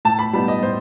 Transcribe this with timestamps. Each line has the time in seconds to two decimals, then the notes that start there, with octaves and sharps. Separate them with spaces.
0.05 A2 A5
0.19 B5
0.33 G3 B3 D#4 B5
0.48 D#5
0.63 A2 C5